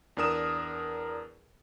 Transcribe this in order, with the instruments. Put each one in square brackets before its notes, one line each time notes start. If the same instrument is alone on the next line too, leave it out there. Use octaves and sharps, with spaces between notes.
[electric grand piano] E2 D4 A#4 D#6 E7